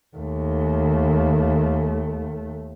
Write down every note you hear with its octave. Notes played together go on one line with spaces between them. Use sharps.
D#2 A3